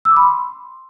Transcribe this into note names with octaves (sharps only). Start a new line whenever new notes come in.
E6
D6
B5
C6